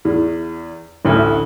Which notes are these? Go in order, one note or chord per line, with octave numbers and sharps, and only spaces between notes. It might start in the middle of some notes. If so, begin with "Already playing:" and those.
E2
A1 D2